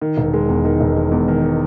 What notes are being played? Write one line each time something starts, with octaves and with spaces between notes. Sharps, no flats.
D#3
E1
G#3
E2
D#3
E1
G#3
E2
D#3